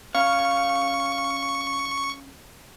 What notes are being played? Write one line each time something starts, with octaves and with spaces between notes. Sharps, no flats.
C#4 F5 C#6